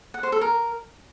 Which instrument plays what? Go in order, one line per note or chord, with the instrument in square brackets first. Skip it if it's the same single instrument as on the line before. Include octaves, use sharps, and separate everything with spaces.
[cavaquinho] F#5
C5
A4
A#4